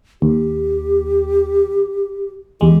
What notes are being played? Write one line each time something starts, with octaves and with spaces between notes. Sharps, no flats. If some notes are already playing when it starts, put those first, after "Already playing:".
D#2 G4
E2 G#3 G4